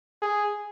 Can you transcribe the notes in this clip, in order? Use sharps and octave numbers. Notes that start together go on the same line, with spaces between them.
G#4